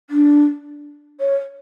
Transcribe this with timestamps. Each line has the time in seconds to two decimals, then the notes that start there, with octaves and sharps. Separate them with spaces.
0.10 D4
1.20 C#5